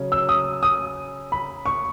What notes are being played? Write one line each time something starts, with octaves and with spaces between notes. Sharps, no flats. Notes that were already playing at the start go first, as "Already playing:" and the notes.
Already playing: C#3 F#3 C#4
E6
D#6
D#6
B5
C#6